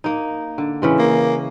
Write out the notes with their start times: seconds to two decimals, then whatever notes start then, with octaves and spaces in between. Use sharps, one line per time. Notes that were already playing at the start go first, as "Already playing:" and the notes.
0.04 A#3 D#4
0.58 D3
0.82 C#3 E3 G#3
0.99 A#3